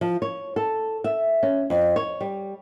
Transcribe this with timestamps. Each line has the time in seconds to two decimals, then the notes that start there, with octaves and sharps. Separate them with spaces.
0.01 F3
0.22 C#5
0.56 A4
1.04 E5
1.43 C#4
1.70 F2
1.96 C#5
2.21 G3